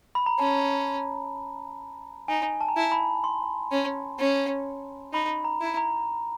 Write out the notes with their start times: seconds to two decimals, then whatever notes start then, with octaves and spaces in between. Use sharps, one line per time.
0.15 B5
0.26 A#5
0.39 C#4 A5
2.28 D#4 G#5
2.61 A5
2.69 A#5
2.76 E4 A5
2.92 B5
3.24 C6
3.71 C#4
4.19 C#4
5.13 D#4 B5
5.44 A#5
5.61 E4
5.77 A#5